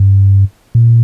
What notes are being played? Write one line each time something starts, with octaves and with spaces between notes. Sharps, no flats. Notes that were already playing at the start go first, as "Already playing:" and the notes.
Already playing: G2
A#2